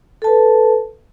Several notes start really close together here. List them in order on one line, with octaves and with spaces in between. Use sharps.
A4 A5 B4